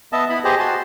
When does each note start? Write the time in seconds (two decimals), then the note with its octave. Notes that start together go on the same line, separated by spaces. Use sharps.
0.13 B3 D#5 E5 A5
0.30 B3 E4 B5
0.45 G4 G#4 C5 D#5
0.59 F#4 A5 C6